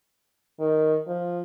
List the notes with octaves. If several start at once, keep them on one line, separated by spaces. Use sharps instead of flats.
D#3
F3